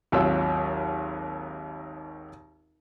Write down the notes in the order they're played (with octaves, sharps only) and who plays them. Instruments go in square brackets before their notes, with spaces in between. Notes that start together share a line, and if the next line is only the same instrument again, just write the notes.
[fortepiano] G#1 D#2 F#3 F4 E6